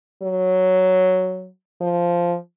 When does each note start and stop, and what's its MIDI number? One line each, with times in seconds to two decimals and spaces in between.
0.22 1.48 54
1.81 2.36 53